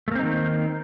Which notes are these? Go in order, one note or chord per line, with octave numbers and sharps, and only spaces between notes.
D#3 A3 A#3 C4 D#4